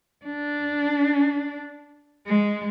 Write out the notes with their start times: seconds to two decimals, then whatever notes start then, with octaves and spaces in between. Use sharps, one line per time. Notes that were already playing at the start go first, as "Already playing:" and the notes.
0.25 D4
2.27 G#3